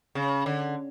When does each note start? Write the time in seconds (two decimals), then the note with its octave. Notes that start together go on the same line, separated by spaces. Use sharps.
0.15 C#3
0.46 D3